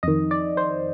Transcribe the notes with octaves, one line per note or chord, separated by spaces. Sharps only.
F2 D#3 D#5
D5
C5